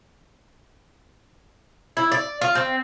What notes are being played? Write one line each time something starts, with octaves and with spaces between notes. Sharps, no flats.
E4
D5
F4
C4